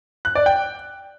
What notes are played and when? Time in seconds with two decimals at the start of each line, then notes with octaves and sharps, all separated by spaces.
0.25 F#6
0.35 D5
0.46 G5